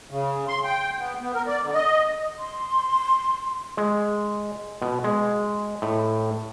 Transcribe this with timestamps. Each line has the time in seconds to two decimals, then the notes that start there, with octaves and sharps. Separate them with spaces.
0.11 C#3
0.48 C6
0.64 G5
0.99 B3
1.21 B3
1.34 A#4
1.47 D5
1.62 D3
1.74 D#5
2.39 C6
3.77 G#3
4.82 B2
5.04 G#3
5.82 A2